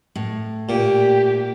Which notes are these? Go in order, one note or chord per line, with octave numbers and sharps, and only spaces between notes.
A2
A#2 G4